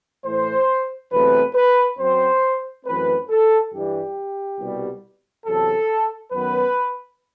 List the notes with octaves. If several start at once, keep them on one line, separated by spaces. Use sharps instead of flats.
A2 E3 A3 C5
E2 C3 F#3 A3 C4 B4
B4
F#2 F#3 C4 C5
F#2 E3 A3 C4 B4
A4
G2 E3 G3 G4
C2 B2 G3
E2 C3 F#3 A4
F#2 D#3 F#3 B3 B4